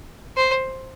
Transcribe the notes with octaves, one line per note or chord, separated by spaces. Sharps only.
C5